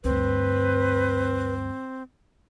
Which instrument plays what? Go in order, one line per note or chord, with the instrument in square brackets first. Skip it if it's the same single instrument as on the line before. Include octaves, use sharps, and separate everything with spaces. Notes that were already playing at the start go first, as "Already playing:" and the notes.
[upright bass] D2 G2 [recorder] C4 [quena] B4